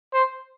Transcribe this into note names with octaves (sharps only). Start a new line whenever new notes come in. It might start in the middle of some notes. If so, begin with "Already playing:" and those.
C5